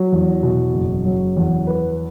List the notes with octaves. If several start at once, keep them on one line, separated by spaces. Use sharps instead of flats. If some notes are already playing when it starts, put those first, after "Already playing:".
Already playing: F#3
E2
B2
F#1
F#3
E2
B4